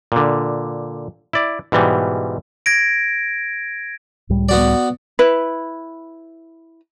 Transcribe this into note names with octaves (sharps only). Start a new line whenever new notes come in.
A#2 D3
E4 D5
G#2 B2 E3 G3
G#6 A#6 D7
C#2 A2 G3
B3 F#4 D5
E4 B4